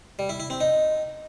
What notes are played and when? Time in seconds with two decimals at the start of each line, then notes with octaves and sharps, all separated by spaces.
0.19 G3
0.29 E4
0.40 E4
0.50 C4
0.61 D#4